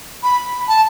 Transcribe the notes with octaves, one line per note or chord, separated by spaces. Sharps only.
B5
A5